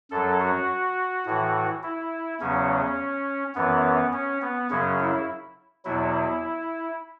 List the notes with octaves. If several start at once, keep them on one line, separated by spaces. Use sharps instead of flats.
F#2 F#3 A4
F#4
A2 E3
E4
E2 C#3 F#3 C#4
F#2 E3 B3
C#4
B3
F#2 C#3 F#3 C#4
E4
E2 B2 F#3 E4